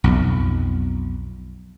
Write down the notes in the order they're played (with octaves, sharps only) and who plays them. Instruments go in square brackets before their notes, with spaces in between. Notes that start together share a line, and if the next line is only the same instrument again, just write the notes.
[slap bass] B1 F2